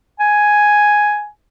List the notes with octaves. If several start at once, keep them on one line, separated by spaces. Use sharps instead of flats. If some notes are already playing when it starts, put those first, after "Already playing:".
G#5